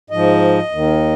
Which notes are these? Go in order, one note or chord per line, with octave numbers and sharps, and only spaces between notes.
G#2 F3 D#5
D#2 D#3